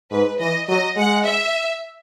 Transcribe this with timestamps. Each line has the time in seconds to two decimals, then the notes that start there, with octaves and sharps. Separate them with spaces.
0.11 G#2 B4
0.39 E3 D#5
0.68 F#3 D#5
0.96 G#3 F#5
1.25 E5